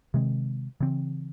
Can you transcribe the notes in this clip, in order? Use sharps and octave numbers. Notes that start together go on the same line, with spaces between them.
C3 D#3 G#3 C4
C#3 E3 C4